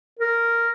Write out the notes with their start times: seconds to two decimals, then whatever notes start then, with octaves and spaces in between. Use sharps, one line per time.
0.19 A#4